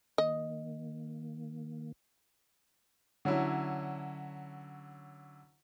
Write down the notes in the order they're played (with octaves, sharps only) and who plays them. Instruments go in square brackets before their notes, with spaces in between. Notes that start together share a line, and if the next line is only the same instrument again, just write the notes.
[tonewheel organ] D#3 A#3 [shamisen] D#5
[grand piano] D3 F#3 C#4 E4